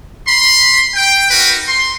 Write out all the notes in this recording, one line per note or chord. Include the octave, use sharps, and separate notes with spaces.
B5 C6
G5
D#4 F#4 A#4 B4
C6